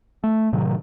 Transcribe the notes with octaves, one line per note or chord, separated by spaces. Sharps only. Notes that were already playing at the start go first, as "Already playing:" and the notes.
A3
A2 C3 D#3 F#3